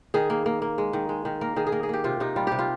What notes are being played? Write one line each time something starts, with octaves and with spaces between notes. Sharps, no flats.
D#3 G#4
A#3
A#3
A#3
G#3
D#3
G#3
D#3
A#3 A#4
D#3 G#4
G#4
A#3 A#4
G#4
A#3 G4
C3 F4
C3 D#4
G3 F4
C3 G4
F4